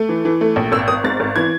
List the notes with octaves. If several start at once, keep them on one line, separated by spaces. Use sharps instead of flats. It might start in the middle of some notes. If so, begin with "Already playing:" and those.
Already playing: A3
E3
E3
A3
A#1
G#1 E6
G#1 D#6
G#2 A6
G#1
E3 G#6